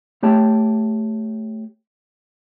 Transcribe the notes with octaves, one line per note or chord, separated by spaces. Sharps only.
A3 G4 C#5 G5 A5